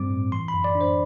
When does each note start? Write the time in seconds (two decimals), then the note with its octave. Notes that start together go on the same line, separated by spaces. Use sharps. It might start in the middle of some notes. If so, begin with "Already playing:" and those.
Already playing: G2 G3 C4 D6
0.10 A2
0.32 E3 C6
0.48 B5
0.54 F#2
0.64 D5
0.75 D4
0.81 C5